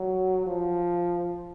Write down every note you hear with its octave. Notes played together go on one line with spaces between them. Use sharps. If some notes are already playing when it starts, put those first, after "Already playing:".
Already playing: F#3
F3